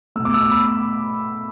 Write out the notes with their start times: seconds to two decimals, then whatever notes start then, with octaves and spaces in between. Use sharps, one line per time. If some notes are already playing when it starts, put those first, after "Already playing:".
0.16 A3 E6
0.19 B2
0.25 D6
0.34 E6
0.42 D6
0.52 B5